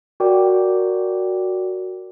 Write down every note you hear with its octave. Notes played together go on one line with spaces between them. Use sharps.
F#4 A#4 D5 G5 D6